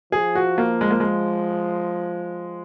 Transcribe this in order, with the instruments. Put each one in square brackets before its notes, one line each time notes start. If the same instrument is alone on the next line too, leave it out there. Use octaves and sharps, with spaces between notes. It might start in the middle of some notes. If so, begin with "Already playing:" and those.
[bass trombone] F3 [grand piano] G#4
[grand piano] F#4
A#3
G#3
A#3
G#3